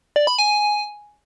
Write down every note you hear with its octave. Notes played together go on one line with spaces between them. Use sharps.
D5
B5
G#5